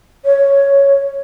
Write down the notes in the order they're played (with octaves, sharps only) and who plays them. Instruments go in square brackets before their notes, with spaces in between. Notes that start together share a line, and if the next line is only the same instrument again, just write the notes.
[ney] C#5